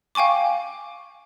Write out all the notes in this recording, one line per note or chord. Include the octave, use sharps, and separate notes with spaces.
F5 G5 G#5 C#6 D6